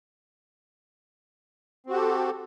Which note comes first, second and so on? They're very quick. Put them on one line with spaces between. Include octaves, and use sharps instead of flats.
C4 F#4 G4 A4